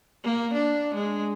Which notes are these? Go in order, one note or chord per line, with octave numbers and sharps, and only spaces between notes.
A#3
D4
G#3